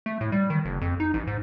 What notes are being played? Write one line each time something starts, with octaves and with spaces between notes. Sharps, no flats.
A3
A2
G3
D#3
F#1
F2
D#4
A1
G#2